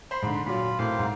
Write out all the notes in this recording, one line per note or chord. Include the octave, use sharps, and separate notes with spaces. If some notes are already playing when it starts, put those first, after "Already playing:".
C5 B5 C6
G#2 D3
A#2 F#3 F4 B5
A2 A#3 C4 F5
G#2